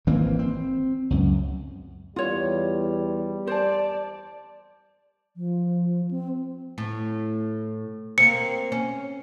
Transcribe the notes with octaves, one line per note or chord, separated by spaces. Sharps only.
G#1 E3 A#3 C4
C4
C#2 F#2
E2 G3 F4 C#5
C5 D5 A5
F3
C4
A2
A#3 C4 C#7
C#4